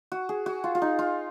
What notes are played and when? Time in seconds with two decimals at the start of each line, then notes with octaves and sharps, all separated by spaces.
0.12 F#4
0.29 G#4
0.46 F#4
0.64 F4
0.75 F4
0.82 D#4
0.99 F4